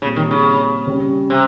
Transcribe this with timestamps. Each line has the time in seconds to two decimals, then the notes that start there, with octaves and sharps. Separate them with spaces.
0.02 A#2 C#3 G3 C4
0.16 D#3
0.31 C#3
0.87 C#3 G3 C#4
1.30 C3